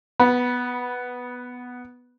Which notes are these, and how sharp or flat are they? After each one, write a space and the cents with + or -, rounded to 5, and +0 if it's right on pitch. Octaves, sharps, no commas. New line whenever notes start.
B3 +0 B5 -20